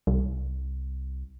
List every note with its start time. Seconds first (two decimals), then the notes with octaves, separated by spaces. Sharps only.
0.07 C2